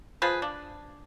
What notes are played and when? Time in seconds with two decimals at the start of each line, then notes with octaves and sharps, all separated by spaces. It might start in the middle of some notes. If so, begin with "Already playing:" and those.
0.22 F3 G#4 B4
0.42 D4